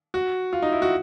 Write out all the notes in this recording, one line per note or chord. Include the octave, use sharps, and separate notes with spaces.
F#4
F4
D#4
E4
F#4